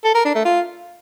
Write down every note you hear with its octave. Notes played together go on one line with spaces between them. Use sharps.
A4
A#4
D4
A3
F4